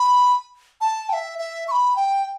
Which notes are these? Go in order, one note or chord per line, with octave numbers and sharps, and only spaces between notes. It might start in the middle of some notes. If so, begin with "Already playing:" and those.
Already playing: B5
A5
G5
E5
E5
C#6
B5
G5